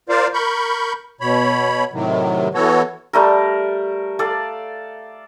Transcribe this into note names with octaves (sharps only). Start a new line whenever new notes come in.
F4 A#4 C5 D5 F5
A#4 B5 C#6 G6
B2 C#5 B5
A2 C3 D#3 F#3
E3 B3 F#4 A4 C#5
G3 A3 A#4
A4 D5 F5